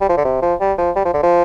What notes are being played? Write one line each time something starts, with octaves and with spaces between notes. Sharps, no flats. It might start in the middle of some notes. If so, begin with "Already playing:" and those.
G3
F3
D3
C3
F3
G3
F3
G3
F3
D3
F3